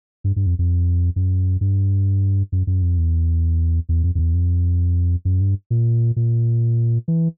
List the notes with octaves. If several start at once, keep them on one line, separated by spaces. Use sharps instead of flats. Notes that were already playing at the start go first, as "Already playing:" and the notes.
G2
G2
F2
F2
F#2
G2
F#2
F#2
F2
E2
E2
F2
F2
E2
F2
F#2
G2
A#2
A#2
E3